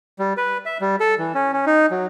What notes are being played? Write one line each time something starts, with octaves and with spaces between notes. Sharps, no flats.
G3
B4
E5
G3
A4
E3
C#4
C#4
D#4
F#3